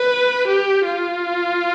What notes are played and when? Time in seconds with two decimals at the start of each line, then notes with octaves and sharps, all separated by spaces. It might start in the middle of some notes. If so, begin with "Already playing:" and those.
Already playing: B4
0.48 G4
0.84 F4